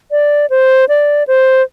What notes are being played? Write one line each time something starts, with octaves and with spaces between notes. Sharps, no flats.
D5
C5
D5
C5